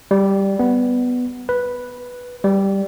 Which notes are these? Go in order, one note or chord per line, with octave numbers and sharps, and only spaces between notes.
G3
B3
B4
G3